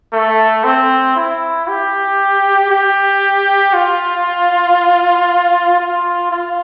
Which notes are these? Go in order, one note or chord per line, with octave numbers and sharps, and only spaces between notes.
A3
C4
E4
G4
G4
F4
F4
F4